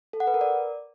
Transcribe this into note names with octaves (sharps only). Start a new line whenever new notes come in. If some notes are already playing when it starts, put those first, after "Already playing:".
A4
F#5
B4
A#4
D5